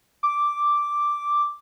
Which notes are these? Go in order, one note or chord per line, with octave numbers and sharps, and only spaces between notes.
D6